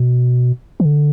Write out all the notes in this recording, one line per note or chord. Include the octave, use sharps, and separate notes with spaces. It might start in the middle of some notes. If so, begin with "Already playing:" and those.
Already playing: B2
E3
D3